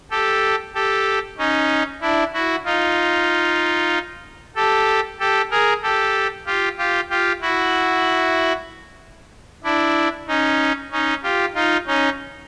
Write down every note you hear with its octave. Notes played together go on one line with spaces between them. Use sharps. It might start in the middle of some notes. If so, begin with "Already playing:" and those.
G4 A4
G4 A4
C#4 D#4
D4 E4
E4 F#4
D#4 F4
G4 A4
G4 A4
G#4 A#4
G4 A4
F4 G4
F4 G4
F4 G4
E4 F#4
D4 E4
C#4 D#4
C#4 D#4
F4 G4
D#4 F4
C#4 D#4